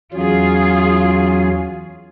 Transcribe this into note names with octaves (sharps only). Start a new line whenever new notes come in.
E2 F#3 C#4 F4 G#4